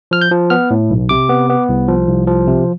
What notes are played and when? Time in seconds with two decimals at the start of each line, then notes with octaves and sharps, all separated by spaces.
0.11 F3 F6
0.21 G6
0.31 F3
0.50 B3 F6
0.71 A2
0.90 B1
1.09 C3 D6
1.29 B3
1.50 B3
1.69 C2
1.88 F3
2.08 C2
2.27 F3
2.47 C3